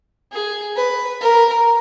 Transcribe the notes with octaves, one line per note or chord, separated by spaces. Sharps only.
G#4
B4
A#4